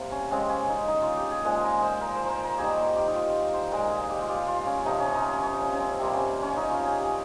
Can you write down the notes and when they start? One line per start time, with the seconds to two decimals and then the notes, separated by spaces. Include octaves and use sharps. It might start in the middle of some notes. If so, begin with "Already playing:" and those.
Already playing: C3 G3 A#3
0.12 C#4
0.31 C#3 G#3 C4
0.49 C#4
0.69 D#4
0.88 D#4
1.02 F4
1.17 G4
1.31 G#4
1.44 A#2 F3 G#3
1.63 A#4
1.83 C5
2.01 A#4
2.15 C5
2.26 A#4 C5
2.44 A#4
2.58 D#3 G3 A#3 G#4
2.96 G4
3.07 D#4
3.15 F4
3.53 C5
3.72 A#2 G#3 A#4
3.91 G#4
4.10 G4
4.22 F4
4.29 G4
4.48 F4
4.66 C#4
4.85 C3 F3 A#3 D#4
5.00 C#4
5.14 D#4
5.28 C#4
5.43 C#4
5.62 C#4
5.73 C#4
5.80 C4
5.99 C3 G3 A#3 C4
6.14 C#4
6.42 C#4
6.56 D#4
6.70 F4
6.85 G#4
6.99 G4